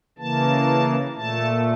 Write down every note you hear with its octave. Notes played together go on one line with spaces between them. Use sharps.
C#3 E3 A#3 A5
A#2 A3 A5